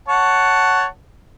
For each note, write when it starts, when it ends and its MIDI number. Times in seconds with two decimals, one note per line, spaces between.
0.08 0.85 73
0.08 0.85 78
0.08 0.85 81